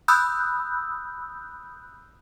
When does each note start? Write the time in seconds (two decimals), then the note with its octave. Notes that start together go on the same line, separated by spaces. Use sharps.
0.08 B5 D#6 E6 F#6 G6